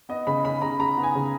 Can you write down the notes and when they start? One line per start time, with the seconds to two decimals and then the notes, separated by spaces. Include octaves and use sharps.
0.09 B3 D#5
0.27 C#3 B5
0.45 C#3 B5
0.62 C#3 A#5
0.79 C#3 A#5
0.97 B3
1.03 G#5
1.15 C#3